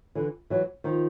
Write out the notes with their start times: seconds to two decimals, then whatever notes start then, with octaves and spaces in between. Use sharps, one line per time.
0.15 D3 E3
0.50 E3 F#3
0.84 D#3 F3